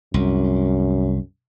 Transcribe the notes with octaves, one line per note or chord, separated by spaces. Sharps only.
C2 F#2